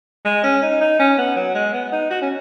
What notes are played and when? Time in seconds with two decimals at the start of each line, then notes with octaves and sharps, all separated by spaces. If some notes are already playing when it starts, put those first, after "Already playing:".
0.25 G#3
0.44 C#4
0.62 D#4
0.81 D#4
0.99 C#4
1.18 B3
1.36 F#3
1.55 G#3
1.73 B3
1.92 D#4
2.10 F#4
2.22 C#4